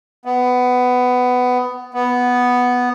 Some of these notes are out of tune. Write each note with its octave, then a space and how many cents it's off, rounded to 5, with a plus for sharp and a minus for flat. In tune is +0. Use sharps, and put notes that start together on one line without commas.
B3 +15
B3 +0